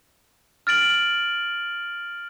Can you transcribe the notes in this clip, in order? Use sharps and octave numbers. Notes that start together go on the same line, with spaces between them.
F6 A6 D7 F#7